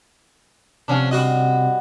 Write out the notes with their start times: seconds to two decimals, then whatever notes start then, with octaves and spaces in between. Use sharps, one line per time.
0.88 C3 F3 C#4 D4
1.11 G3 F#4 D#5